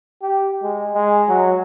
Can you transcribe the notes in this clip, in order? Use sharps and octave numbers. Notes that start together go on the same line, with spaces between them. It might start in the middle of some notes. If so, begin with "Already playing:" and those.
G4
G#3
G#3
F#3